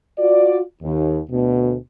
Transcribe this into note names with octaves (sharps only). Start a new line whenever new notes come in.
F4 F#4 D5
D#2
D2 B2